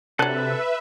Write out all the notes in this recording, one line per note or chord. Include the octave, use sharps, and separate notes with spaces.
C3 F#3 D4 A4 B4 E5 F#6